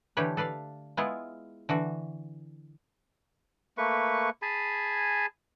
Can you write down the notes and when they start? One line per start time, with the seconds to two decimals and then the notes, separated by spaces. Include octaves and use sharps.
0.17 D3 E3 A3 G4 B4 C#5
0.37 A4 B4 D5 F5
0.97 G#3 B3 E4 F4
1.69 D3 E3 F#4
3.78 A3 A#3 B4 C#6
4.42 G#4 G#5 A5 B5